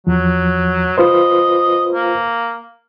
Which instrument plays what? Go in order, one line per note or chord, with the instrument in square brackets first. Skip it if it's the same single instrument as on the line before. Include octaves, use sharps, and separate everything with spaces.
[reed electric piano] E2 F3 [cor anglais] F#3
[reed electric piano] F4 B4 C5 [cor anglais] D#5
[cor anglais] A#3